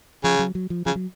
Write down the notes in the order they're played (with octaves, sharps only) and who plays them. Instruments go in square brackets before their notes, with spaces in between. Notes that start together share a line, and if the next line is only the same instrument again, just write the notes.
[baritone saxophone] C#3 [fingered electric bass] F3
[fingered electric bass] F#3
F#3
F3
[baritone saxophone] C#3 [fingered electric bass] F3
[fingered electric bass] F#3